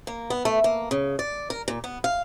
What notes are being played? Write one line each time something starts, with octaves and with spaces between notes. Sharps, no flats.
A#3
B3
A3
A#3
C#3
D5
A#4
A#2
B3
F5